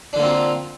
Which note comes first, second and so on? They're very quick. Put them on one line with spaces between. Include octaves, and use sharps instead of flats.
D4 D3 A#3 C4 F4